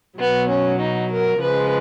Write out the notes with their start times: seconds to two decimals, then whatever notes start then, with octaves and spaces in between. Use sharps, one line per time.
0.18 B2 F#3 B3
0.49 C#4
0.79 D#4
1.10 A#4
1.40 C#3 F3 G#3 B4